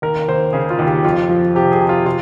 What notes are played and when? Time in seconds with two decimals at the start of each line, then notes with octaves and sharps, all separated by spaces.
0.02 D#2 A#4
0.28 D#2 C5
0.53 C#3 G#4
0.70 F4
0.79 D#2
0.87 G4
1.04 F2 F4
1.29 F3
1.55 C3 G4
1.72 G#4
1.81 C3
1.89 F4
2.06 F4